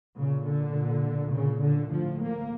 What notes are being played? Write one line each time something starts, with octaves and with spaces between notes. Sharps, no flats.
A#2 C#3
D3
A#2
A#2 C#3
D3
A2 F3
A#3